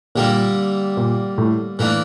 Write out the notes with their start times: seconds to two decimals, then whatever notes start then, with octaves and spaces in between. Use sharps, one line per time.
0.15 A#2 D3 G3 A#3
0.97 A#2
1.38 A2
1.79 A2 E3 A#3 D4